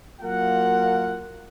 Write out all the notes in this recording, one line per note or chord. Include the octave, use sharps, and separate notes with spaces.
F#3 A#3 F4 A#4 F#5